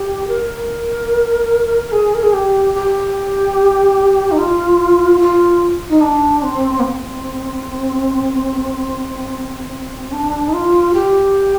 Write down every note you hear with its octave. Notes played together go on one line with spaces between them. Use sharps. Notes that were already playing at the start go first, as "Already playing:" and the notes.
Already playing: G4
A#4
G#4
A#4
G#4
G4
G4
D#4
F4
F4
D#4
D4
C4
A#3
C4
D4
D#4
F4
G4